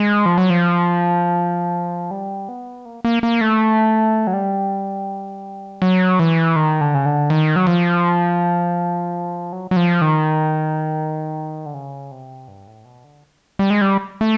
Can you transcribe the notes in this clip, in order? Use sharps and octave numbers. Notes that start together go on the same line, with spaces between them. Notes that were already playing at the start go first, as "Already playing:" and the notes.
Already playing: G#3
F3
F#3
F3
G3
B3
A#3
A#3
A#3
A3
F#3
G3
F#3
E3
D#3
D3
C#3
D3
D#3
F#3
F3
F#3
F#3
F3
D#3
D3
C#3
C3
G2
A2
B2
D3
G3
G#3
G3
A3